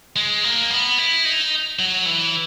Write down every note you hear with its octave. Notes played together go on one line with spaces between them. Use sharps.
G#3
A#3
B3
E4
D#4
F#3
E3